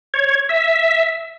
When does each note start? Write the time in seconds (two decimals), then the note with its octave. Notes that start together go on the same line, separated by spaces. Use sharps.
0.14 C#5
0.49 E5